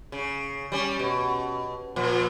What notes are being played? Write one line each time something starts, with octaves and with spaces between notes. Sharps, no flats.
C#3
G3 C#4
B2
A#2 F3